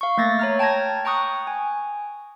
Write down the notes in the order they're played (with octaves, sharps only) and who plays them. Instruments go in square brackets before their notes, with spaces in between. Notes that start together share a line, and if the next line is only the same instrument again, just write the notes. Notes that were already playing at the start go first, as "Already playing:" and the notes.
[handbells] F5 C#6
A3 A#3 A6 A#6
C#5 A#5 F6
G5 A5 A#5 G#6 A#6
G5 A#5 C#6 D#6 F#6
G#5